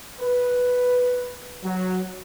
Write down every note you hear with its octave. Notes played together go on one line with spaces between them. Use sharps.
B4
F#3